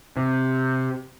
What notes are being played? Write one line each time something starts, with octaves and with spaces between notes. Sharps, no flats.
C3